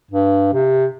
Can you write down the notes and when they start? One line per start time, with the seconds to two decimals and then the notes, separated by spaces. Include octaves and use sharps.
0.11 G2
0.53 C3